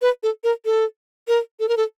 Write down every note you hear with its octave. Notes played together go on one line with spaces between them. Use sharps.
B4
A4
A#4
A4
A#4
A4
A#4
A4